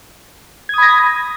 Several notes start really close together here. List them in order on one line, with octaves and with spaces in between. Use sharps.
G#6 D#6 B5 A#6